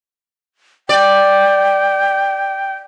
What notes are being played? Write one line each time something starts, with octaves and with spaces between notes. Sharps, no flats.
D5 G5